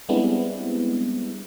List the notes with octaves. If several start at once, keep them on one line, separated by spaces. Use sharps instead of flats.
G3 G#3 B3 C4 D4 E4